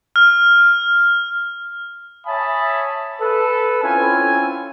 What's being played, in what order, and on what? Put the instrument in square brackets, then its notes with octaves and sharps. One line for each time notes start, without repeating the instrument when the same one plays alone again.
[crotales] F6
[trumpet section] C#5 E5 G#5 A5 B5 D#6
A4 B4
C4 C#4 E4 F4 G#5